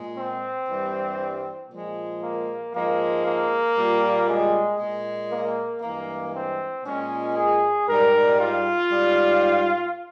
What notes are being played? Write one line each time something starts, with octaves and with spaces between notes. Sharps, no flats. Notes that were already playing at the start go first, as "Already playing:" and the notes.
Already playing: A#2 G#3
C4
G2 E3 G3
A#2 F3 G#3
A#3
G#2 F3 G#3 A#3
A#3
A#2 G3
G#3
A#2 G#3
A#3
G2 E3 G#3 A#3
C4
A#2 G#3 C#4
G#4
G#2 G3 A#4
F4
G#2 G3